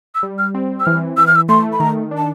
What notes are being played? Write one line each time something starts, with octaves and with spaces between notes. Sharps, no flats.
E6
G3
F6
C4
E6
E3 F6
E3 E6
F6
E6
A3 C6
B5
D#3 A#5
D4
A5